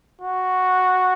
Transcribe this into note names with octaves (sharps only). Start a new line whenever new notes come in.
F#4